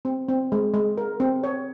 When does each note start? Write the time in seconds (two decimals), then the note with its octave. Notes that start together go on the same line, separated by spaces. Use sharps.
0.05 C4
0.29 C4
0.52 G#3
0.74 G#3
0.98 A#4
1.20 C4
1.44 C#5